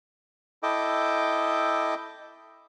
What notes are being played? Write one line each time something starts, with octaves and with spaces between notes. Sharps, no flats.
E4 A4 D#5 G5 D6